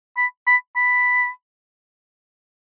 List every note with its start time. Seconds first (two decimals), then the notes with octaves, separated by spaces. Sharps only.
0.17 B5
0.47 B5
0.76 B5